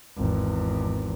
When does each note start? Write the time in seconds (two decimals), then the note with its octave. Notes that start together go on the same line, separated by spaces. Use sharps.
0.17 G#1 E2